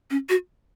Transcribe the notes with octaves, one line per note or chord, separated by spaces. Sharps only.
C#4
F#4